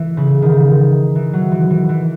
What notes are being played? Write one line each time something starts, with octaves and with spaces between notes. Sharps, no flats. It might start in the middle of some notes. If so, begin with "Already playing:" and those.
Already playing: E3
C#3
D#3
E3
F#3
E3
E3
E3